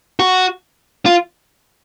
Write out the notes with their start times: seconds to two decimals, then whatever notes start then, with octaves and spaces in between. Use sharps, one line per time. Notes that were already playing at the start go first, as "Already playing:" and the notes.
0.19 F#4
1.06 F4